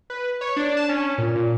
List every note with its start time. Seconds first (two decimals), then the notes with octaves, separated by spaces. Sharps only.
0.10 B4
0.41 C#5
0.56 D4
0.77 A5
0.89 C#4
1.18 A#2
1.36 A#2